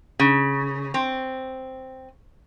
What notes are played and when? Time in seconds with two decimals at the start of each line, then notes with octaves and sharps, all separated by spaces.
0.19 C#3
0.94 C4